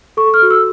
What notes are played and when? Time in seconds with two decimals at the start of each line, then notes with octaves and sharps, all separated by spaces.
0.17 A4 C#6
0.34 F6
0.42 F#4
0.51 E6